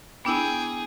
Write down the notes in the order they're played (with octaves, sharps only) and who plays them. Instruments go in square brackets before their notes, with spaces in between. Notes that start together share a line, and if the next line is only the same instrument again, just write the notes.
[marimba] B3 D4 E4 [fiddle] G#4 [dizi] G5